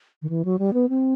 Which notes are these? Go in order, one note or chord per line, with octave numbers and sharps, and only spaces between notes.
D#3
E3
F#3
G3
B3
C4